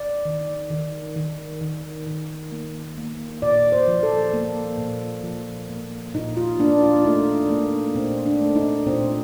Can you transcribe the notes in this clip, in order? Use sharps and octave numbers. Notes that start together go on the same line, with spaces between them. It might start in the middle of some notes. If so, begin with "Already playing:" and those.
Already playing: D5
D#3
D#3
D#3
D#3
D#3
A#3
A#3
A#2 D5
C5
F3
A4
A#3
A#2
F3
A#3
A#2 D#4
F4
A#3 D4
F4
A3 D#4
A3 A#3
A#2 C4
D4
A3
D#4
A#2 C4